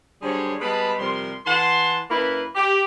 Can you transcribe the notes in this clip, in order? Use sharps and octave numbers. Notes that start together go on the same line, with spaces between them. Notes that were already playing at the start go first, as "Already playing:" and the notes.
D3 F#3 G3 G#4 C5 C#5
G3 G#3 B3 B4 A5 B5
C3 F3 G3 A#4 C6
E3 F#5 A5 C6
F#2 A#3 E4 B4
G4